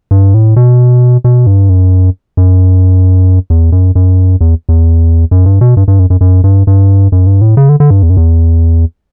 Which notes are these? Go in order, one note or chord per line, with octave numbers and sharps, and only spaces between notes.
G2
A2
B2
B2
G2
F#2
F#2
E2
F#2
F#2
E2
E2
F#2
G2
B2
G2
G2
F#2
F#2
F#2
G2
G2
F#2
G2
A2
C#3
D3
D3
G2
E2
F#2
E2